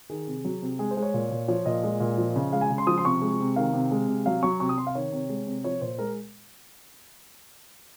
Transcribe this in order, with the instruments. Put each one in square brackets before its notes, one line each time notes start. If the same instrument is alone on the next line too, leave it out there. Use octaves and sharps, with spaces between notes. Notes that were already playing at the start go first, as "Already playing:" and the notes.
[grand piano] D#3 G#4
C3
F#3
C3
G#3 G#4
C5
G#3
C#5
A#2
A#2
F3 C#5
A#2 D#5
G#3
A#2
F3
C#3
G#3 F5
G#5
C#3
C6
F3 D#6
C6
C3 C#6
G#3
C3
D#3 F5
C3
G#3
C3
F#3 F5
F#3 C#6
C3 C#6
D#6
C3 C6
F5
D#3 C#5
C3
G#3
C3
F3 C#5
A#2 C5
G#3 A#4